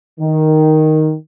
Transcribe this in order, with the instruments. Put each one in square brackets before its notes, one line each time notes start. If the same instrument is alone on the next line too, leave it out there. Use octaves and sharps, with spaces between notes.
[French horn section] D#3